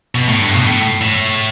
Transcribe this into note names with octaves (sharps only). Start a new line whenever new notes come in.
B2
A2
G2
B2
A2
A2